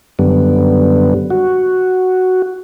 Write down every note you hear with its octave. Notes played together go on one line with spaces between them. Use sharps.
F#2 D3 G3 B3
F#4